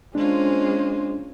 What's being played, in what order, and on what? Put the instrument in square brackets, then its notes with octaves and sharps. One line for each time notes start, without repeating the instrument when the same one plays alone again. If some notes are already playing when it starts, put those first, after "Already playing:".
[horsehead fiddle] G#3 C5 [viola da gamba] A#3 C#4 F4 [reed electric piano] D4